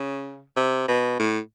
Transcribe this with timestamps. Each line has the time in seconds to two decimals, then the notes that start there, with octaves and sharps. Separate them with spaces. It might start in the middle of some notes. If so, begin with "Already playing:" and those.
Already playing: C#3
0.57 C3
0.88 B2
1.20 A2